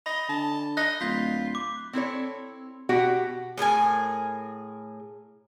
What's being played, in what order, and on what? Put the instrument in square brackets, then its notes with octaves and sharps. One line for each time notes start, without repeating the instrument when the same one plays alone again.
[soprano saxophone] D#5 [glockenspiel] B5 G7
[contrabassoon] D3 [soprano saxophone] A5
[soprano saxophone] D#5 [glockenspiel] F#6
[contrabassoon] D1 [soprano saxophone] F4 [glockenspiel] G6 B6
[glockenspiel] D6
[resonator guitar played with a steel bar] C4 E4 A4 C#5
B2 F#4 G4 F#5 G5
[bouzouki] A2 G#4 A#4 G#5